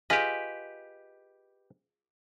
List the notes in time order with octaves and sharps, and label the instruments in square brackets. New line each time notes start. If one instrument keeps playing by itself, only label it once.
[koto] F4 G#4 D#5 [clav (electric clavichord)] G4 B4